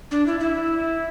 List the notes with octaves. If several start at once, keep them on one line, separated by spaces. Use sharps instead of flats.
D4
E4
E4